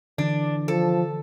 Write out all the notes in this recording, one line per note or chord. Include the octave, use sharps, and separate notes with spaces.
D3 E3 D4
F3 A4